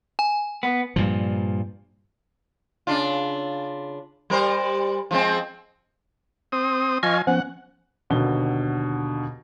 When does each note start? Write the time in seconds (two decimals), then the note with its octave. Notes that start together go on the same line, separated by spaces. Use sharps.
0.19 G#5
0.63 B3
0.96 G2 A#2 F3
2.87 C#3 D4 F4
4.30 G3 A#4 C5
5.11 F3 G#3 C4
6.52 C4 D#6
7.03 F3 D#5 G#5 C#6 F6
7.27 F3 B3 C#4 F#5
8.10 D#2 B2 D3 G7